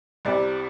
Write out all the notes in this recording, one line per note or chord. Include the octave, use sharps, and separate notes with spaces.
C2 C3 G3 D5